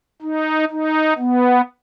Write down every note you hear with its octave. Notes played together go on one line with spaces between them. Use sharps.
D#4
D#4
B3